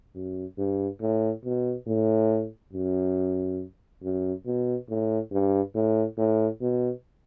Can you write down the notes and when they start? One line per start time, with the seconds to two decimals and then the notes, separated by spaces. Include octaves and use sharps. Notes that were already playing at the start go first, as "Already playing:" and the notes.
0.15 F#2
0.58 G2
1.01 A2
1.45 B2
1.87 A2
2.73 F#2
4.03 F#2
4.46 B2
4.89 A2
5.32 G2
5.75 A2
6.18 A2
6.61 B2